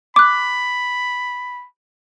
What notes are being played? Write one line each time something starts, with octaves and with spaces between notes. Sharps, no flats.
B5 D6 F#6